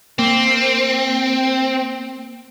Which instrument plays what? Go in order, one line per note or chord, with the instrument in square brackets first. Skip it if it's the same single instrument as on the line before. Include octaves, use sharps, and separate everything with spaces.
[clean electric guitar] A#3 [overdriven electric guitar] C4